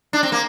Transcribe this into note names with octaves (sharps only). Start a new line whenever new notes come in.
D4
C4
A#3